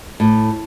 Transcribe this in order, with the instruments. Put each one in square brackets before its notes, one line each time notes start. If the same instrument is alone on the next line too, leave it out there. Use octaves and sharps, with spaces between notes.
[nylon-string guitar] A2